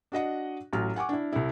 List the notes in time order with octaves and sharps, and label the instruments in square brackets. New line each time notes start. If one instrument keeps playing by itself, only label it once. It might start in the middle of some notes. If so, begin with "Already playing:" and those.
[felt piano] D4 F#4 D#5 F#5
A1 F#3 F6
F#5 G#5 C#6 D6
D4 E4
C2 E4